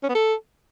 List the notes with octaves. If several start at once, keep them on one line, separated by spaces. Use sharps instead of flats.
C#4
B3
A4